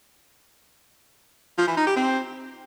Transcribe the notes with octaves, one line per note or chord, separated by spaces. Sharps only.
F3
E3
D#4
G4
C4